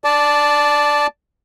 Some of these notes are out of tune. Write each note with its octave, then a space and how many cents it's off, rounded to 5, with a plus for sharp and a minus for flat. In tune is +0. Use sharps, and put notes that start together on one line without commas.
D5 +0 A5 -10